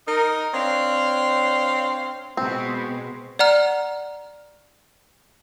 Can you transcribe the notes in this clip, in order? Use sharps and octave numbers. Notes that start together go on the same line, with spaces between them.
D#4 A#4
C4 D4 C#5 F5
B2 G#3 C4
D5 F#5 A#5 F6